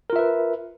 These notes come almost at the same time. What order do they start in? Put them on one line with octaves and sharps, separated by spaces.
A#4 F4 E5 B4